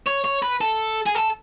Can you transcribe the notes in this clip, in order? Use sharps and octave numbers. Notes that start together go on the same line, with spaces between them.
C#5
C#5
B4
A4
G#4
A4